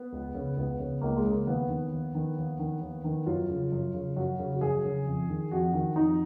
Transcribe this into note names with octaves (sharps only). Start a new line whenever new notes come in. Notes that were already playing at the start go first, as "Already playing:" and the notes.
Already playing: B3
C#2
C#3
C#2 B3
C#3
C#2 A#3
G#3
C#3
A#3
D#2 B3
D#3
D#2
D#3
D#2
D#3
D#2
D#3
F#2 F4
C#3
F#2
C#3
F#2 F#4
C#3
F#4
F#2 G#4
C#3
F2
D#3
F2 F#4
D#3
F2 D#4